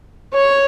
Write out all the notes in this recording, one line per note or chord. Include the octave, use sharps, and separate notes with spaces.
C#5